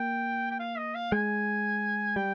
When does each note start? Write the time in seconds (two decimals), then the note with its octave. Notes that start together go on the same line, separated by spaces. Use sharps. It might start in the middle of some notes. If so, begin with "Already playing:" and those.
Already playing: A#3 G5
0.51 G5
0.60 F5
0.78 D#5
0.95 F5
1.12 G#3 G#5
2.16 G3 G5